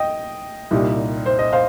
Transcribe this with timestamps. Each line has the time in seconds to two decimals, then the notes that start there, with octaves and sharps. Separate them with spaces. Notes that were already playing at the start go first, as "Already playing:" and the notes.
Already playing: D#5 G5
0.71 C2 A#2 G3 D#4
1.26 C5
1.39 D#5
1.52 C5 F5